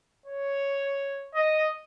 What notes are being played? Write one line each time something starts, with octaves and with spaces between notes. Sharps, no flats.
C#5
D#5